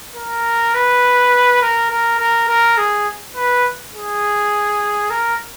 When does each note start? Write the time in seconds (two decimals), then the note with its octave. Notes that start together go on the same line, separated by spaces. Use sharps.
0.16 A#4
0.74 B4
1.61 A#4
1.90 A#4
2.19 A#4
2.48 A#4
2.77 G#4
3.36 B4
3.94 G#4
5.10 A#4